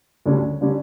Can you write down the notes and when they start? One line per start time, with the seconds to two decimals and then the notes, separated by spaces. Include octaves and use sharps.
0.26 D2 D3 G3 C#4
0.61 D3 G3 C#4